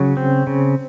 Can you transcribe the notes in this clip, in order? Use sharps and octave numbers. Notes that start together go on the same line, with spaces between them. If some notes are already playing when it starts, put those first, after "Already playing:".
Already playing: C#3 F#3
C4
C#3